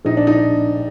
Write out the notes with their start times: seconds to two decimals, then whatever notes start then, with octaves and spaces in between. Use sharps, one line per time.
0.05 A#1 D#4
0.17 D4
0.27 D#4